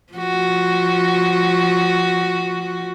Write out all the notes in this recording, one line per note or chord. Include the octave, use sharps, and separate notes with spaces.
F3 F#4